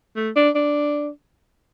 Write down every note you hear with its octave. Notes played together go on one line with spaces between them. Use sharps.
A3
D4
D4